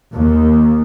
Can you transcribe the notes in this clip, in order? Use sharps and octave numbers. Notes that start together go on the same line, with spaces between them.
D#2